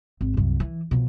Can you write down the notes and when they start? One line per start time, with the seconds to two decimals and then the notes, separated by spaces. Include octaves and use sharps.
0.21 G#1
0.34 C2 F#2
0.60 E3
0.91 B2 F3